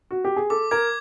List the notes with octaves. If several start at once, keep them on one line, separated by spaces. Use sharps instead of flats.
F#4
G4
G#4
A4 D6
A#4 G#6